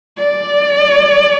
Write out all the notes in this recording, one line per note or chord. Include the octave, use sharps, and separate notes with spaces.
D5